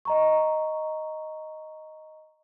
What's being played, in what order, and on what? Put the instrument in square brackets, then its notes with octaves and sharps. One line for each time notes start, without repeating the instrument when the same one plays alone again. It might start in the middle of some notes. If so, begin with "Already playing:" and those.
[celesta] D#5 A#5 C#6